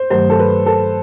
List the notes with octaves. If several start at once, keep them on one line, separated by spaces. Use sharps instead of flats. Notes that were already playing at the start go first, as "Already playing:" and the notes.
Already playing: C5
G2 D#3 F#3 A3 C5
A4
B4
A4